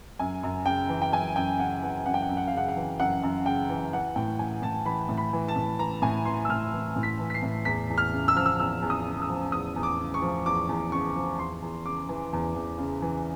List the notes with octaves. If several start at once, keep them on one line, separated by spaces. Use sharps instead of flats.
F#2 G#5
F#2
C#3 G5
E3
G5
F#2 G#5
F#2 G5
C#3 F#5
E3 F#5
F#2 F#5
G5
F#5
F#2
F#5
F5
C#3 F#5
F#5
E3
F#2 F#5
F#2
C#3 G5
E3
E3 F#5
A2 G5
E3 G#5
A2 A5
E3 B5
A2
B5
E3
A5
A2
E3 A#5
A2 G#5
E3 C6
E6
A2 F6
E3
A2
B6
E3
B6
C7
A2
E2 B6
E2
F6
C#3
E6
F3 F6
E6
E2 E6
E2
D#6
C#3
E6
F3
E2 D#6
E2
D6
C#3
C#6
F3
E2 D6
E2
C#3 C#6
F3
E2 C6
E2
C#3 D6
E3
E2
E2
C#3
E3